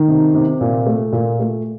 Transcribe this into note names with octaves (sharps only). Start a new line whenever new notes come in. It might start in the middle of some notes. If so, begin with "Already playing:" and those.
Already playing: D#3
C3
C3
A#2
A3
A#2
A3